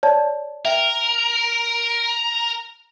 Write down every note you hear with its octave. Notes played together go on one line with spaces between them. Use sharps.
C#5 D5 A5
A#4 E5 G5